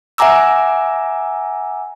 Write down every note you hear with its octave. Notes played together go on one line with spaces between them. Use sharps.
E5 F#5 G#5 A#5 D6 E6